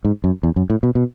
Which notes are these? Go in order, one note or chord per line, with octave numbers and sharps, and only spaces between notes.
G#2
F#2
E2
F#2
A2
B2
B2